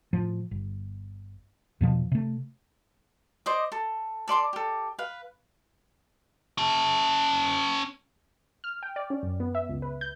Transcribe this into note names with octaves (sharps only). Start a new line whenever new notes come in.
A2 F3
G1
E2 B2 F3
C3 A3
C5 D5 D#5 D6
A4
A4 D5 C6 D6
G4 A4
B4 F5
C#4 A5
F6
G5
D5
C#4
F#2
B3
E5
C#2
B4
G6